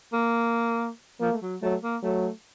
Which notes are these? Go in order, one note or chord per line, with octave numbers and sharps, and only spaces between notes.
A#3
F3 A#3
A3
F#3
F#3 A3
A#3
F#3 A3